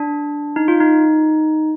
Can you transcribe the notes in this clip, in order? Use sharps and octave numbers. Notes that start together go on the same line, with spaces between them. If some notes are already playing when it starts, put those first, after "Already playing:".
Already playing: D4
D#4
F4
D#4